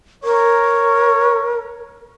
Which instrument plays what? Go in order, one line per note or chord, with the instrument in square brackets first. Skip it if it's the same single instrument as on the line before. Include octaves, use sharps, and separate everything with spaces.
[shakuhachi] A#4 [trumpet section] C#5